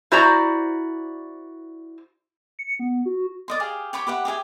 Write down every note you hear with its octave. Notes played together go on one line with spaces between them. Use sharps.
E4 F#4 C5 D5 A#5
C#7
B3
F#4
D5 D#5 C6
G4 G#4 F5
G4 C#5 B5 D6
G4 B4 E5 F#5
G4 G#4 E5 G#5